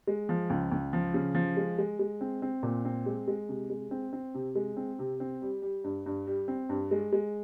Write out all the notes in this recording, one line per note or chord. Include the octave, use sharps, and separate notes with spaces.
G#3
F3
C#2
C#2
F3
C#3
F3
G#3
G#3
G#3
C4
C4
A#2
C4
G#3
G#3
C3
G#3
C4
C4
C3
G#3
C4
C3
C4
G3
G3
G2
G2
G3
C4
G2
G#3
G#3